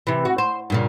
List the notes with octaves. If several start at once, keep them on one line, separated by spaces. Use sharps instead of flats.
C3 E3
F#4
C5
G2 A#2 C#3